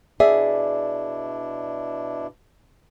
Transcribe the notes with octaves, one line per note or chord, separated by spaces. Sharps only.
B2 D4 E4 G#4 D5 E5